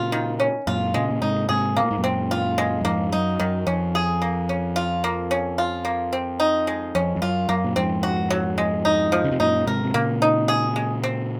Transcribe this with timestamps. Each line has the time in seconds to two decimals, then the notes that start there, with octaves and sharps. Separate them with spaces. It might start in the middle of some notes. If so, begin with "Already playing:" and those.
Already playing: A#2 C#3 F4
0.12 D#3
0.40 C#4
0.67 F#2 A#2 F4
0.94 A#2 C#3 G#3
1.10 A#2
1.22 G#2 C3 D#4
1.49 G#2 C3 G#4
1.76 C3 A#3
1.83 A#2
1.91 G#2
1.97 F#2 A#2
2.04 C4
2.31 F4
2.58 G#3
2.81 F#2
2.84 F2 G#2 A#3
3.12 F#2 D#4
3.40 F#2 D#3
3.67 F2 C#4
3.95 G#4
4.22 A#3
4.49 C#4
4.76 F4
5.04 A#3
5.31 C#4
5.58 F4
5.85 A#3
6.13 C4
6.40 D#4
6.67 G#3
6.95 F2 C#4
7.16 F2
7.22 F#2 F4
7.49 F#2 A#3
7.64 A#2
7.76 F2 G#2 C4
8.03 F#4
8.30 F#3
8.58 G#3
8.85 D#4
9.12 F3
9.24 C#3
9.31 C3
9.40 F#2 A#2 D#4
9.67 G#2 C3 A#4
9.84 C3
9.94 A#2 C#3 A#3
10.22 D#4
10.48 G#4
10.76 G#3
11.03 C4